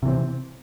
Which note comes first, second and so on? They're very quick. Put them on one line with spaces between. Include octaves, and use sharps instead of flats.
C3 E3 C4